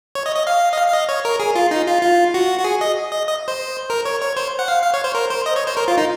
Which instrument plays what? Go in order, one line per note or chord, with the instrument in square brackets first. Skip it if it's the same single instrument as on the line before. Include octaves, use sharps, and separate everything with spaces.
[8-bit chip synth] C#5
D#5
D#5
F5
D#5
F5
F5
D#5
C#5
A#4
G#4
F4
D#4
F4
F4
F#4
F#4
G#4
D#5
D#5
D#5
C5
A#4
C#5
C#5
C5
F#5
F5
F5
C#5
C5
A#4
C5
D#5
C#5
C5
A#4
F4
D#4